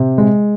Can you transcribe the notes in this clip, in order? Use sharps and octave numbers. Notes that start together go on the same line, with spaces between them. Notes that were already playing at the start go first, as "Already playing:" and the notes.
Already playing: C3
G#3